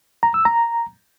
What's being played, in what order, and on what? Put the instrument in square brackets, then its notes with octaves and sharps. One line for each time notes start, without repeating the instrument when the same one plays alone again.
[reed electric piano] A#5
E6
A#5